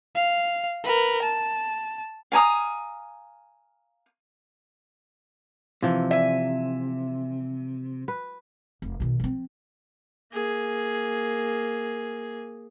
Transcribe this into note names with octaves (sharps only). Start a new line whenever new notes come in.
F5
A#4 B4
A5
F5 G#5 A#5 D#6
C3 E3 F3
E5 G#5
B4
F1
B2 D#3
F3 C4
A#3 G#4